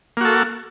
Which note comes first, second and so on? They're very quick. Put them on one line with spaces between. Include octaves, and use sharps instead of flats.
A#3 F#4 A4